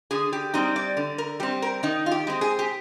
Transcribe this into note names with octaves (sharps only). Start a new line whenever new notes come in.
D3 G#4
G4
G3 C4 D#4
D5
D3
A#4
G3 C4 G4
A#4
D#3 D#4
F4
G4
G#3 C4
G#4
G4